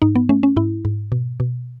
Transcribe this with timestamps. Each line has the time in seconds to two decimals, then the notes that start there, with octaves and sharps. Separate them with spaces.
0.02 G#2 D#4
0.16 B3
0.29 A3 C#4
0.43 C#4
0.56 G#2 E4
0.85 G#2
1.12 B2
1.40 B2